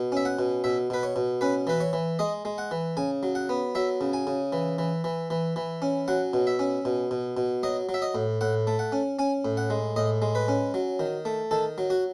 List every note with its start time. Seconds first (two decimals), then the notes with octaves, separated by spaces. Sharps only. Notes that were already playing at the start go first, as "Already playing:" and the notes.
Already playing: B2
0.12 C#4 E5
0.25 F#5
0.39 B2
0.64 B2 E5
0.90 B2 B4
1.03 C#5
1.16 B2
1.41 C#4 B4
1.67 E3 B4
1.80 C#5
1.93 E3
2.19 G#3 D#5
2.45 G#3
2.58 F#5
2.71 E3
2.97 C#3 G#5
3.23 F#3
3.35 F#5
3.49 B3
3.75 F#3 E5
4.01 C#3
4.13 G#5
4.27 C#3
4.53 E3
4.78 E3
5.04 E3
5.30 E3
5.56 E3
5.82 C#4
6.08 F#3 F#5
6.33 B2
6.47 E5
6.59 C#4
6.85 B2
7.11 B2
7.37 B2
7.63 F#3 D#5
7.89 F#3
7.94 E5
8.02 D#5
8.15 A2
8.41 A2 F#5
8.67 A3
8.79 F#5
8.92 C#4
9.19 C#4 G#5
9.45 A2
9.57 F#5
9.70 G#3
9.96 A2 D#5
10.22 G#3
10.35 B4
10.48 C#4
10.74 F#3
11.00 D#3
11.25 A3
11.51 D#3 A4
11.78 F#3
11.90 F#4